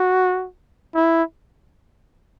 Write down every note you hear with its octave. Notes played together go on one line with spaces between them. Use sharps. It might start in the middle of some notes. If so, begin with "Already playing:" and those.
Already playing: F#4
E4